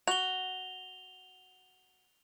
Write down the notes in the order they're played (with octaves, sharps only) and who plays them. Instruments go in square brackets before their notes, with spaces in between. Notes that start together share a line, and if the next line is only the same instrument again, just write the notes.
[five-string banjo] F#4 [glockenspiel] F7 G7